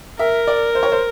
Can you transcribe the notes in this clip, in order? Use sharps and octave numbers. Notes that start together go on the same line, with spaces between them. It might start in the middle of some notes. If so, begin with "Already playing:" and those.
A#4 E5
D5
C5
C#5
C5